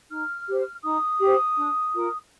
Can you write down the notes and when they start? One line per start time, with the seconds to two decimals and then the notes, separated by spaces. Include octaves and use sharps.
0.09 D#4 F6
0.46 G4 C5
0.83 D#4 D#6
1.20 G4 C5
1.56 D4
1.93 F4 A#4